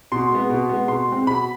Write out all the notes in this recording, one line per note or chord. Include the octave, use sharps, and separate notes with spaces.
B2 C6
G#3 B3
B2
G#3 B3
B2 C6
G#3 C4
B2 B5